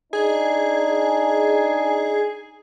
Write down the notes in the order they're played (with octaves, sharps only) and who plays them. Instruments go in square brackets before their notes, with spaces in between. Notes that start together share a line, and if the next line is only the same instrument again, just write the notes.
[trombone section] D4 D#4 [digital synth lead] G#4